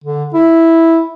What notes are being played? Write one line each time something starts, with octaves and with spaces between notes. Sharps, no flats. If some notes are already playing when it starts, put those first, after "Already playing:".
D3
E4